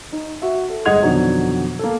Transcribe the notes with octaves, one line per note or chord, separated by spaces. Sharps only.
D#4
F#4 E5
A4
G1 G#3 D#5 F#5 G#6 F7
F2 B2 D3 D#3 F#3
A#3 A4